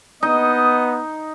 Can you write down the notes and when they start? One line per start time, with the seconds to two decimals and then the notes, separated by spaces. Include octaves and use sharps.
0.23 B3 D#4 D#5